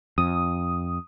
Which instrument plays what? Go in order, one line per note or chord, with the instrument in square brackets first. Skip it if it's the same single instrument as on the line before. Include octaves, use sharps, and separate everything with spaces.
[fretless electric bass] F2 [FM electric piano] D#6